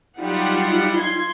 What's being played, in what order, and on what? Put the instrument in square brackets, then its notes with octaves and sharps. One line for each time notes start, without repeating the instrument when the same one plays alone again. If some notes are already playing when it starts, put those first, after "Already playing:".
[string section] F#3 G3 F#5 [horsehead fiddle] D#4 F4
[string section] C6 G#6